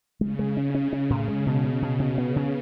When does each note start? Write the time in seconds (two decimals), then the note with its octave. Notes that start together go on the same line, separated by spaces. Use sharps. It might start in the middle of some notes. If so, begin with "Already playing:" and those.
0.21 C#3 G#3
0.39 G#3
0.57 C#4
0.74 C#3 C#4
0.93 C#4
1.10 A2
1.28 G#3
1.46 B2
1.64 B2
1.82 B2
2.00 B2
2.18 B3
2.36 C#3